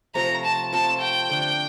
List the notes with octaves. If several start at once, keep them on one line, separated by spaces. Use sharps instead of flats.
C3 F3 A3 A#5
A5
F3 A3 C4 A5
G5
D3 A3 D4